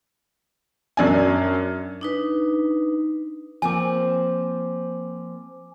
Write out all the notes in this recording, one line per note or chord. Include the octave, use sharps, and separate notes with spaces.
F#2 D4 G#5
D4 D#4 B4
F3 A#3 C4 G#5 D6